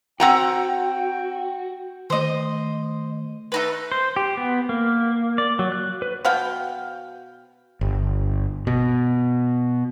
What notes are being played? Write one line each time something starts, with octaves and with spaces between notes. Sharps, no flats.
C4 F#4 F#5 G5 A#5
D#3 A3 C5 D#5
A3 D#4 B4
C5
G4
B3
A#3
D5
F#3
F#6
B4
B2 F#4 F5 G5
G1
B2